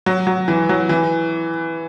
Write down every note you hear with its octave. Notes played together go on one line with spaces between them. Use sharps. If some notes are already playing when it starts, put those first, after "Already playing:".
F#3
F#3
E3
F#3
E3